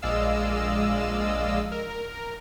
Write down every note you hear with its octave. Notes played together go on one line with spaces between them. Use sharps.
A#1 G#3 D5 D#5 F5 E6
A#4